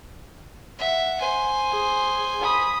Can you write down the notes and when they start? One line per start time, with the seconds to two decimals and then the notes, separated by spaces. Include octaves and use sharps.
0.78 E5 F#5
1.20 C5 G#5
1.71 G#4
2.41 B5 D#6